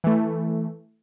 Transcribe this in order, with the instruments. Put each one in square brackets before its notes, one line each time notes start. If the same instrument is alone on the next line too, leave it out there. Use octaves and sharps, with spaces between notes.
[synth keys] E3 A3